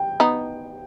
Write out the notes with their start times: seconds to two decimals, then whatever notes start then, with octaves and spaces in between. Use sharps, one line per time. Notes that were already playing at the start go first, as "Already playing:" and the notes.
Already playing: G5
0.20 B3 D#4